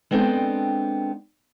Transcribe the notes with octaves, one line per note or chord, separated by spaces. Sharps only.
G#3 B3 C4 D4 A4 G5